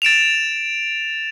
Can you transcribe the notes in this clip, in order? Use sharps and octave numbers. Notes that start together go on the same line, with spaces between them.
A6 D7 E7 F7